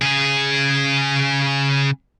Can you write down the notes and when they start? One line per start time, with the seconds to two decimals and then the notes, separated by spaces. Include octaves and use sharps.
0.02 C#3 G#4